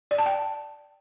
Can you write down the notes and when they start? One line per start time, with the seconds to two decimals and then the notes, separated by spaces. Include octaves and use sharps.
0.11 D5
0.18 A5
0.26 G5